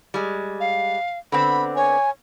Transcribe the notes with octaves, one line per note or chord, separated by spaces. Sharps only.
G3 G#3
F5
D3 B3 C4 B5
C#5 G#5